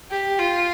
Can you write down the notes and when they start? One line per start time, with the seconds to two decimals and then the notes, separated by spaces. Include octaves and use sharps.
0.11 G4
0.39 F4